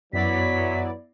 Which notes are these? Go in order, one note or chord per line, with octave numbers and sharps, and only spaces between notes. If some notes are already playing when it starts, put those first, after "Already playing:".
F#2 E3 F#3 B3 E4 D5 B6